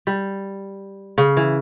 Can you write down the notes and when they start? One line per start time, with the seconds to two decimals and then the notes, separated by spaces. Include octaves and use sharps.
0.07 G3
1.18 C#3
1.37 E3